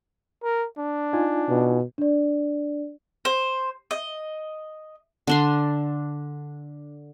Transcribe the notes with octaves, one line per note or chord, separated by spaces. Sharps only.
A#4
D4
D#4 F4 G#5
B2
D4 D5
C5
D#5
D3 D4 C6